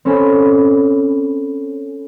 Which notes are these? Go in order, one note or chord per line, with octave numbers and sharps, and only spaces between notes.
C4 C#4 A4 G#5 B5